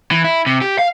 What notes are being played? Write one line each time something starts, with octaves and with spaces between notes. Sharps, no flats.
E3
E4
C3
G4
F5